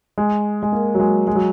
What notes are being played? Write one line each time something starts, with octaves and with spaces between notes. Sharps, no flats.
G#3
G#3
A#3
F#3
G#3
G#3
F#3